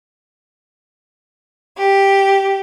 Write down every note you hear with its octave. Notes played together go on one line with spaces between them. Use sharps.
G4